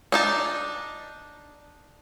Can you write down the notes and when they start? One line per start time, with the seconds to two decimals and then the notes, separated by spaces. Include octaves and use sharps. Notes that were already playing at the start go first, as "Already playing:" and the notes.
0.12 D4 D#4 A5